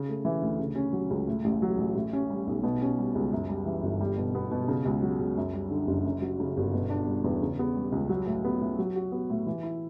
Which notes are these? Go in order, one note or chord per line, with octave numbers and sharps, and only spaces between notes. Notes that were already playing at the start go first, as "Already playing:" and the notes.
Already playing: C#3
A3
E3
D2
C#3
C#4
F#3
C#2
A2
A1
F#3
A1
A2
C#4
G3
B1
B2
C#4
G3
C#2
F#2
G3
E3
G1
G3
B2
B3
B2
C#3
C#2
F#3
C#2
F#2
G3
D3
F#1
F#2
F#3
C#3
G1
B2
D4
G3
E2
C#3
B3
G3
C#2
F#3
A2
B3
A2
F#3
F#4
B3
A2
E3
E4